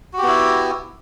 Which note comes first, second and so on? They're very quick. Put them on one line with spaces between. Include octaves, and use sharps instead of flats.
F#4 G4 B3 E4